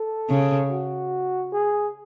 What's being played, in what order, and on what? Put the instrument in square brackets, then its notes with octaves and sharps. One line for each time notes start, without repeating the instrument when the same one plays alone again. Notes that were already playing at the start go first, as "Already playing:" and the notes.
Already playing: [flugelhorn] A4
[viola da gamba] C#3
[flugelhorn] F#4
G#4